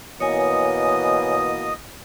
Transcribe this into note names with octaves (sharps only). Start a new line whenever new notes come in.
B2 E3 A#3 C#5 D#5 G#5 D#6